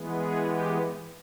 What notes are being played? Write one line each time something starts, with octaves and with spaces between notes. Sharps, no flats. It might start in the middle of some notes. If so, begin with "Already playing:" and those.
Already playing: E3 G#3 B3
G#4
G4